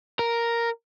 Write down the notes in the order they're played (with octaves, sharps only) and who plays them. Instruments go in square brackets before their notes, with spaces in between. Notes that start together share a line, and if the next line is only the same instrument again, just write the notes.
[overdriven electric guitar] A#4